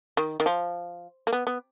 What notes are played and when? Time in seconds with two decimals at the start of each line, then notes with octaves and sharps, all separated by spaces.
0.17 D#3
0.40 D#3
0.46 F3
1.27 A#3
1.33 B3
1.47 B3